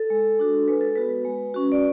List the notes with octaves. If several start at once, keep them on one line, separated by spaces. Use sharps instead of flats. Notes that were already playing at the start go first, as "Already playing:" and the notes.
Already playing: A4
G#3
D4 F#4
G#3 B4
A4
B3 F#4 B4
G#3
C#4 F#4
D5